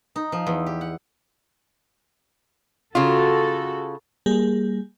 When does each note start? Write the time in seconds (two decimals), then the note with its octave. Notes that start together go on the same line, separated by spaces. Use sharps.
0.16 D#4
0.32 F3
0.47 E2
0.66 G4
0.81 F#5
2.95 C#3 F4 F#4 A4
4.26 G3 A#3 G#4